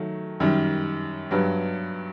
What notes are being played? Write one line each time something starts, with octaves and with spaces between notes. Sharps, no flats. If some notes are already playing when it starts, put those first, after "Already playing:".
Already playing: D#3 F#3 A3
F#2 D#3 G3
G2 F#3 B3